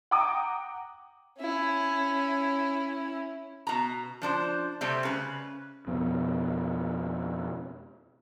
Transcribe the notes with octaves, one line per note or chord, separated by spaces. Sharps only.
F#5 G5 A#5 D6 D#6
C#4 E4
B2 A#5
F3 D4 C5
C3 G3 A3 C4
C#3 B4
F2 B2